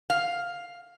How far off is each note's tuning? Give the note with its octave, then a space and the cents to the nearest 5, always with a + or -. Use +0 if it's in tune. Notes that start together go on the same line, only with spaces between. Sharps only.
F5 +5